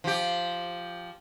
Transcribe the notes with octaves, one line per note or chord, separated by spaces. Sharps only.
F3 G4